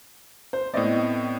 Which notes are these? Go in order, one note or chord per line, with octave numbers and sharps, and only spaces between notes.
C5
A2 B3 C4 D5 D#5